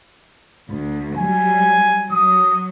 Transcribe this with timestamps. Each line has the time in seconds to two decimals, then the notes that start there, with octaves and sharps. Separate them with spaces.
0.69 D2
1.17 F#3 G3 G#5
2.11 F#3 D#6